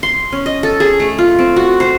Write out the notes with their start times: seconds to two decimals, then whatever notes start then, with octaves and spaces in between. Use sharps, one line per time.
0.03 C6
0.32 C#4
0.46 D#5
0.63 A4
0.80 G#4
1.00 A3
1.18 F4
1.39 C4
1.56 F#4
1.80 C5